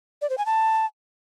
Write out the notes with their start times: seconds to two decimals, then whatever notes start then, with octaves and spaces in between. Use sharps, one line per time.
0.22 D5
0.30 C5
0.38 G#5
0.46 A5